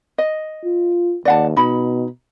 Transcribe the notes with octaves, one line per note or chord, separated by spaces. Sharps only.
D#5
F4
D#2 D5 F#5 A5
B2 D#4 B5